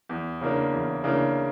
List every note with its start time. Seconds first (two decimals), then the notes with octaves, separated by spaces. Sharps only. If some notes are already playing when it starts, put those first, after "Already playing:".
0.09 E2
0.41 C#3 E3 A#3 D4
0.72 E2
1.04 C#3 E3 A#3 D4